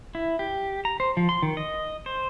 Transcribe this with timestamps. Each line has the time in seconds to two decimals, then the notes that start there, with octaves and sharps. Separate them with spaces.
0.15 E4
0.39 G4
0.85 A#5
1.00 C5
1.17 F3
1.29 C6
1.43 D#3
1.57 D#5
2.06 C5